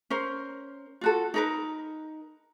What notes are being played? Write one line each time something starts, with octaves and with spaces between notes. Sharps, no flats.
C#4 A#4 C5
F4 F#4 A4
D#4 A#4 B4